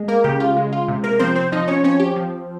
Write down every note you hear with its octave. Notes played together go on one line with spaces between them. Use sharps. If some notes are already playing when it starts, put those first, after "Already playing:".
Already playing: G#3
A#3 A#4
C#3 G4
F4
G#3
F4
C3
A#3 A#4
F3 C4 C5
C4 C5
F3 D#4 D#5
C#4 C#5
C4 C#4 C#5
G4
F3